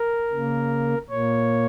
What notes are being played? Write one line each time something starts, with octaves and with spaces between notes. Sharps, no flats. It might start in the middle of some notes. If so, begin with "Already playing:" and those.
Already playing: A#4
C#3 A#3
A#2 A#3 C#5